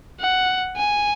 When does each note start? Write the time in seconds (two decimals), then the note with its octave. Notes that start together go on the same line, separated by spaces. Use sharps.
0.20 F#5
0.77 G#5